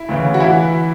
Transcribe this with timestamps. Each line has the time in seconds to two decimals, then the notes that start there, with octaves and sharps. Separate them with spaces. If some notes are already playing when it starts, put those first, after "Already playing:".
Already playing: E4
0.09 D2 C#3 E3
0.34 F#4
0.40 E3 E4